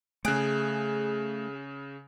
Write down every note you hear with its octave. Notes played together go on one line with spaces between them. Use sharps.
C#3 A3 G#4 F#6 D7